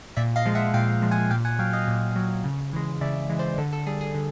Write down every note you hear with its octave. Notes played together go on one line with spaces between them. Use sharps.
A#2 D5 E5
D#5 F5
F3 G#3
E5 F#5
A#2 F5 G5
F3 G#3
F#5 G#5
A#2 F5 G5
F#5 G#5
F#3 F5 G5
D#5 F5
A#2
F#3
C#3
E3 G#3
C#3 D5 E5
E3 G#3
C5 D5
D3 A4
A4
G3 G#4
G#4
D3